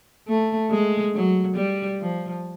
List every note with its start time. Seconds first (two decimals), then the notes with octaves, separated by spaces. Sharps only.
0.27 A3
0.70 G#3
1.14 F#3
1.56 G3
2.00 F3